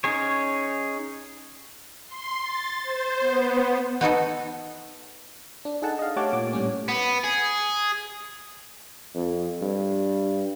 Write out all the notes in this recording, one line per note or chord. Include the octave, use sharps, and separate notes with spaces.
C#4 D#4 G#4 C#5
C6
A6
C5
B3
B3 D#4 F#4 A4
D4
D#4 G#4 A4 F#5 A5
D#5 F5
A3 G4 C#5 F#5 A5 D6
A#2 C#5 D6
A2 G3 C#4
B3
G#4
F2
G2